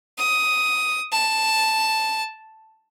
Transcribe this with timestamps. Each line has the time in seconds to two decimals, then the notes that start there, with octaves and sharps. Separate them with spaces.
0.18 D#6
1.12 A5